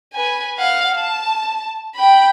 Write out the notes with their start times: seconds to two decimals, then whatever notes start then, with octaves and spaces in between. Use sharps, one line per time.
0.14 B4 G#5
0.57 F5 F#5
0.95 A5
1.95 G5 B5